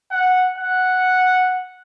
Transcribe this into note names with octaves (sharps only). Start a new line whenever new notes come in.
F#5
F#5